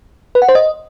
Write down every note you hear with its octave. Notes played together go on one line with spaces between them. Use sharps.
B4
F#5
C5
D#5